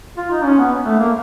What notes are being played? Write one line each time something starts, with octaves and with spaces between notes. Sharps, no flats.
F4
D#4
C#4
B3
A3
A#3